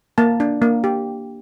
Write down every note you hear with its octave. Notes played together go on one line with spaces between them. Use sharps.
A#3 A5
D4
A#3
G4